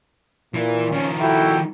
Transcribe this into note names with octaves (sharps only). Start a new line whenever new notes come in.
A#2 E3
D#3 F3 C#4
E4 F#4 A4 G5